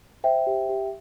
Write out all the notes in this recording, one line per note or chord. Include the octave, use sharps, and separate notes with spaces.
C5 E5 G5
G4
G4